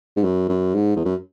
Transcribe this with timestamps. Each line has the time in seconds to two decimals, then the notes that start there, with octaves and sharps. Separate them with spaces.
0.16 G#2
0.23 F#2
0.48 F#2
0.75 G#2
0.96 E2
1.05 F#2